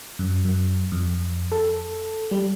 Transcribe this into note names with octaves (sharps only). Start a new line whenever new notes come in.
F#2
F#2
F2
A4
G3